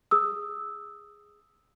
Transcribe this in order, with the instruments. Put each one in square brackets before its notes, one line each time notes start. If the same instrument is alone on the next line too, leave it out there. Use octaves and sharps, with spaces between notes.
[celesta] G#4 D#6 E6